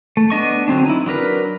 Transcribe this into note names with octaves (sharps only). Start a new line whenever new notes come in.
A3
B3 D4 D#5 C#6
D3 F#3 C4 D4
D#4 E4
F#3 D4 A#4 B4